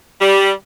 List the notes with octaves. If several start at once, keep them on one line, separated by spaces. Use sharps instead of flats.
G3